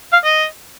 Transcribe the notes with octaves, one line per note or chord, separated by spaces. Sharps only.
F5
D#5